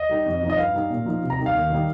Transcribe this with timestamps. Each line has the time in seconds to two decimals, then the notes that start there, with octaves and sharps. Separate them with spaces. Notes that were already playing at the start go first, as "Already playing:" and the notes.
Already playing: D#5
0.09 G3 D#4
0.26 F2
0.41 F3 D#4
0.50 D#5
0.57 G2 F5
0.74 G3 D#4
0.90 A#2
1.05 F3 D#4
1.22 C3
1.30 A#5
1.38 G3 D#4
1.46 F5
1.54 D#2
1.70 D#3 G3 D#4